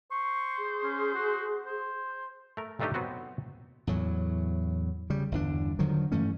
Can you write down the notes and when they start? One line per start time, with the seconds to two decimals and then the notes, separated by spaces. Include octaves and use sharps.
0.11 C5 C#6
0.58 G#4
0.84 C#4
1.14 F#4
1.66 C5
2.57 A3 A#4
2.80 G2 D#3 A3 D4 D#4 G4
2.94 F#3 B3 C4 F#4
3.87 E2 A2 F#3
5.10 C#3 G3
5.32 G1 E2 D4
5.79 D3 D#3 F3 F#3
6.12 G2 E3 A3 C#4